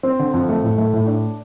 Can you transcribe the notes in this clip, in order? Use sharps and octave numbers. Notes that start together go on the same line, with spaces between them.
C4
D3
F2
A3
A2
A3
A2
D4